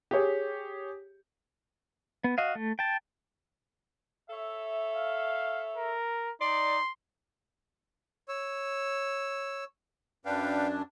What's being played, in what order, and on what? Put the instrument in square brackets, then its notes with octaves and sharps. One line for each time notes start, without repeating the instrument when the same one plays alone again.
[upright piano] G4 G#4 C#5
[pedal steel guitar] B3
F#4 D#5 F5
A3
G5 A5
[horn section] A4 C#5 E5
[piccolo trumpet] F5
A#4
[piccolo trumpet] D#4 [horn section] D5 [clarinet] C6
[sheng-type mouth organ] C#5 E6
[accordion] F#2 D4 [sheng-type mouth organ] B4 F5 G5